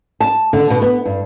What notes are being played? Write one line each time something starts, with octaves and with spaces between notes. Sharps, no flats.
A5
D3
B2
B3
G2